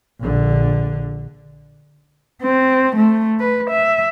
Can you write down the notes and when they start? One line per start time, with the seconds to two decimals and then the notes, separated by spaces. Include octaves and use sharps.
0.21 A#1 D3
2.43 C4
2.96 A3
3.40 B4
3.70 E5